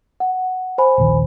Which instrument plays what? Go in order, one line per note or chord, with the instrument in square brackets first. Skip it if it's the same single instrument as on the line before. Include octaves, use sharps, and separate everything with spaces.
[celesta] F#5
C5 G#5 B5
[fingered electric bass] D#1 A#1 D#3